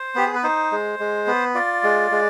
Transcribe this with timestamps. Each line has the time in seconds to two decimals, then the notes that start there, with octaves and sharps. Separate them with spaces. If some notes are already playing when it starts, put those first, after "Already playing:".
Already playing: C5
0.15 B3 G4
0.26 G#4
0.35 B4
0.43 D#4 C5
0.71 G#3
0.99 G#3
1.27 B3
1.55 F4 D5
1.83 G#3
2.11 G#3